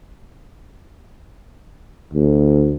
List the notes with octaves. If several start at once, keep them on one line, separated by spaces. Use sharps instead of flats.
D2